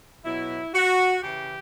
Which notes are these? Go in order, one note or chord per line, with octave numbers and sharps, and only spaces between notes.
B2 F#3 E4
F#4
C#3 E3 G4